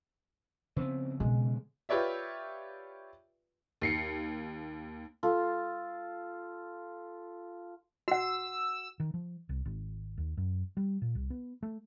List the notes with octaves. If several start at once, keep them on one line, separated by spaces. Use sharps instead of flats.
C#3 F3 B3 C4
B2 G#3
F4 G4 B4 C#5 D5 E5
D#2 C7 C#7
F4 A4
F#4 F#5 E6
D#3
F3
C2
G#1
D#2
F#2
G3
A#2
C2
B3
A3